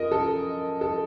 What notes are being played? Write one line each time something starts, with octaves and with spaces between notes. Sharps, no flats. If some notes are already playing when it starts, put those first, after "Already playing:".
Already playing: F#2 F3 A#4 D#5
A4
A4